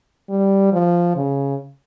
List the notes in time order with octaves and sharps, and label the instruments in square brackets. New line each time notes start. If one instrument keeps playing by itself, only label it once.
[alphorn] G3
F3
C#3